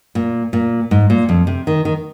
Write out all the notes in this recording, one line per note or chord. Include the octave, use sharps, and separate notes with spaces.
A#2
A#2
G#2
A#2
F2
C3
D#3
D#3